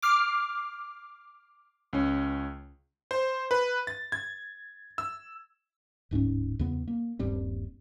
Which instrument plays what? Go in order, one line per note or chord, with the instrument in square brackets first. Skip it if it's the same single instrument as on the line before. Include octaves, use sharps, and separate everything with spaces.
[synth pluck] D6 F6 C7
[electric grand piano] C#2 C#4
C5
B4
A6
G#6
E6
[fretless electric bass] D1 G#2 A#3 C#4
E2 C#3 B3
A#3
D#1 G2 G3 C4